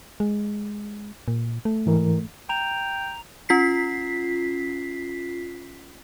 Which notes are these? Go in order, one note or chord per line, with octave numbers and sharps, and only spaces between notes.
G#3
A#2
A3
G#2 E3 A#4
G5 A#5 F7
C#4 F4 B6 C7